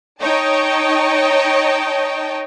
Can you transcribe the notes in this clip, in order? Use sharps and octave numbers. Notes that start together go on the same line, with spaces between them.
D#4 C#5 D#5 G5 A5